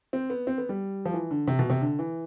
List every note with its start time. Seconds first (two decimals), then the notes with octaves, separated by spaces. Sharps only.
0.13 C4
0.30 B3
0.47 C4
0.58 B3
0.69 G3
1.05 F3
1.13 E3
1.31 D3
1.47 C3
1.59 B2
1.70 C3
1.81 D3
1.99 E3